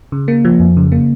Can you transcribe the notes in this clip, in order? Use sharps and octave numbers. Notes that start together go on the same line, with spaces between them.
C#3
A#3
F3
F2
C#3
A#3